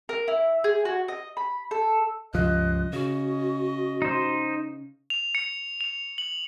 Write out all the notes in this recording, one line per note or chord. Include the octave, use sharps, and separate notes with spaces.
A#4
E4
G#4
F#4
D#5
B5
A4
C#2 G2 F3 D#5 F#6
C#3 F#4
D#4 C5
F7
C#7
F7
F#7